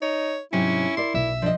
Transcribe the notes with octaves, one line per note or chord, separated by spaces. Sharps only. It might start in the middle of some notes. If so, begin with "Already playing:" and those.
D#4 C#5
G#2 C3 F#3 C#4 E4
A#4 D5 C6
B1 E5
F3 D4 D#5